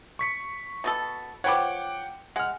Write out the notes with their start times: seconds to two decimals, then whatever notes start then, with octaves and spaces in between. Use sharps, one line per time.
0.19 C#6 B6 C#7
0.84 B2 B3 A4
1.44 F3 B4 C#5 F#5 G5 D6
2.36 G#3 F#5 F6